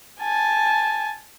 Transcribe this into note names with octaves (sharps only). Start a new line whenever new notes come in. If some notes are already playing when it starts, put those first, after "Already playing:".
G#5 A5